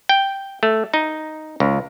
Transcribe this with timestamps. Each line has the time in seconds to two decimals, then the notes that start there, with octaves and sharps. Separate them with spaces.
0.09 G5
0.63 A3
0.94 D#4
1.60 C#2